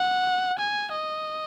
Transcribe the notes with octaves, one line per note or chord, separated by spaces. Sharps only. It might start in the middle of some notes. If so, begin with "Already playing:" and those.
Already playing: F#5
G#5
D#5